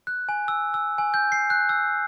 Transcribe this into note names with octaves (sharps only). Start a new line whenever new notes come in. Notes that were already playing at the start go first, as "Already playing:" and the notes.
F#6
G#5
E6
E6
G#5
G6
C7
F#6
E6